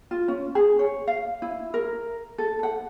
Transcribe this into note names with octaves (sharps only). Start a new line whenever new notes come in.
F4
C#4
G#4
C#5
F5
E4
A#4
A4
F#5